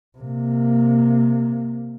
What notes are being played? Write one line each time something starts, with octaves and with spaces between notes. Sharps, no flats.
C3 A#3